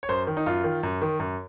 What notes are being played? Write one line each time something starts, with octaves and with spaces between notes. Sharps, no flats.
C#5
F#2 C5
D#3
D#4
F#2 F4
D#3
F#2
D#3
F#2